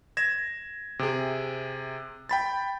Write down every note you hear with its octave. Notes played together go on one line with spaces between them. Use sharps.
G#6 A#6 E7
C3 G#4
G5 B5 A6